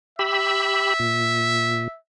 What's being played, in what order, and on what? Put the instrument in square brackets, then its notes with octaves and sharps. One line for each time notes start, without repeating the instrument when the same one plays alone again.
[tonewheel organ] G4 B5 E6 [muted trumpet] E5
[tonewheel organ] A#2